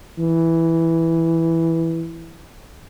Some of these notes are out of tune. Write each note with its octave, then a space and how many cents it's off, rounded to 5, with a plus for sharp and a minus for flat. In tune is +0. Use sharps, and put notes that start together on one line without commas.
E3 -5